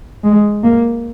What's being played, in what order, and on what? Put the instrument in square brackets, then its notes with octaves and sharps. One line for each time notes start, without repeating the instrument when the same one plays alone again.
[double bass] G#3
A#3